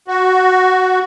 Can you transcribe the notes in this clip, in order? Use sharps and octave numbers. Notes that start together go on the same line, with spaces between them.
F#4